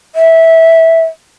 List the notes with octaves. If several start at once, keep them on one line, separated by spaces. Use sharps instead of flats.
E5